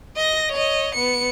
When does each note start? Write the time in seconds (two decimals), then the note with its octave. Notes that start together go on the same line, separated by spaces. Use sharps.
0.16 D#5 A#6
0.52 C#5 D#5
0.95 B3 C#7